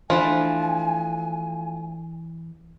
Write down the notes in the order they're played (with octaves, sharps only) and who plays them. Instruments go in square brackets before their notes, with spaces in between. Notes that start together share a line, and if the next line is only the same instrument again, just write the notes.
[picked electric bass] E3 [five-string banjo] F3 [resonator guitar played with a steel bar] A3 D4 B4 [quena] G#5